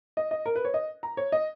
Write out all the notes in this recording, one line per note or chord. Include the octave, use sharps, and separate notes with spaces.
D#5
D#5
A#4
B4
C#5
D#5
A#5
C#5
D#5